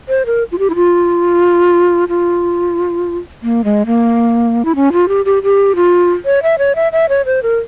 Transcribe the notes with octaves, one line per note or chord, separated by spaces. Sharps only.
C5
A#4
F4
G4
E4
F4
F4
A#3
G#3
A#3
E4
C#4
F4
G4
G4
G4
F4
C#5
E5
C#5
E5
E5
C#5
C5
A#4